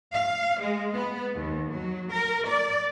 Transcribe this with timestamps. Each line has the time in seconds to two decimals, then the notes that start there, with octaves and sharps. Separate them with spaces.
0.14 F5
0.60 G#3
0.93 B3
1.35 D#2
1.72 F#3
2.13 A#4
2.47 D5